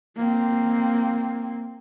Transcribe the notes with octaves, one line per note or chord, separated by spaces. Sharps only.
A#3 C4